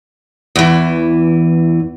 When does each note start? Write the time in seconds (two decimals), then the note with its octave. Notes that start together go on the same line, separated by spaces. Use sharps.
0.56 E2 E3